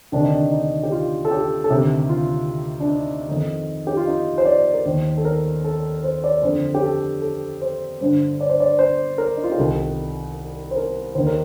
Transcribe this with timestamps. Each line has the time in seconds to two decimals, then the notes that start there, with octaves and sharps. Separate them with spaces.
0.12 D2 C3 D#3 D4
0.23 D#4
0.34 D4
0.52 D#4
0.83 G4
0.92 F4
1.25 A4
1.31 G4
1.64 A4
1.70 D2 C3 D#3 G4
2.09 F4
2.80 D4
2.88 D#4
3.28 F2 D#3 D#4
3.87 G4
3.97 F4
4.07 D#4
4.38 C5
4.45 D5
4.74 A#4
4.85 D#2 D#3 C5
5.17 A4
5.25 A#4
5.64 A4
6.04 C5
6.24 D5
6.43 F2 D3 C5
6.75 G4
6.83 A4
7.22 A4
7.62 C5
8.01 G2 D3 C5
8.41 D5
8.49 C5
8.60 D5
8.79 C5
9.18 A#4
9.37 D#4
9.43 F4
9.52 G4
9.58 C2 C3 D#3 A4
10.71 C5
10.76 A#4
11.15 D#2 D#3 C5
11.27 A#4